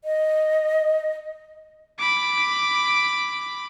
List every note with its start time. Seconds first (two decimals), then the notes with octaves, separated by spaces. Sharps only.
0.04 D#5
1.99 B5 D6